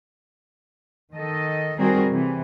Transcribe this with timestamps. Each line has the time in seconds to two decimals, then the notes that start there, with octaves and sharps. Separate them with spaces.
1.14 D#3 A4 D#5
1.77 D#3 G3 C4 F#4 G#4 A#4
2.10 C3 E3